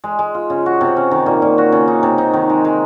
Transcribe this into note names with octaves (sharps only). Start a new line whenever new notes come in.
G#3
G#3
F4
C#3
F#4
C3
C#4
D#3
A#2
A#2
F#4
C#3
D#4
C3
D#4
D#3
G#3
G#3